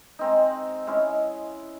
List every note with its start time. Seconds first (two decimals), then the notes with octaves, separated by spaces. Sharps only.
0.19 G#3 C4 D#4
0.87 G#3 C#4 E4